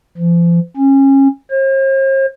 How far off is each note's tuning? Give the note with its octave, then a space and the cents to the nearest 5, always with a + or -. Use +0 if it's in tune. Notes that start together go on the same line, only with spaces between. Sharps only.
F3 -40
C#4 -25
C5 +45